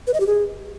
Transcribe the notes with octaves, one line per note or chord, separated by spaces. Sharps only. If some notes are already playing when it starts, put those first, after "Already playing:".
B4
D#5
G4
G#4